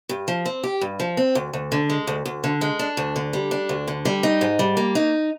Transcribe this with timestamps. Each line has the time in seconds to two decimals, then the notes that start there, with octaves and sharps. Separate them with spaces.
0.09 G2
0.28 F3
0.45 C4
0.63 G4
0.81 G2
1.00 F3
1.17 C4
1.35 D2
1.53 D2
1.72 D3
1.90 G#3
2.07 D2
2.26 D2
2.44 D3
2.61 G#3
2.79 D4
2.97 D2
3.16 D3
3.33 G3
3.51 D4
3.69 D2
3.88 D3
4.05 G3
4.23 D#4
4.41 G#2
4.59 G3
4.77 A#3
4.95 D#4